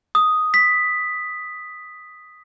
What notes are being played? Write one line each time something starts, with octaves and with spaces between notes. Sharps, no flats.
D#6
B6